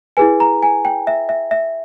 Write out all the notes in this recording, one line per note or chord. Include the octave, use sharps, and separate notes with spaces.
E4 G#4 B4 G#5
A#5
G#5
G5
E5
E5
E5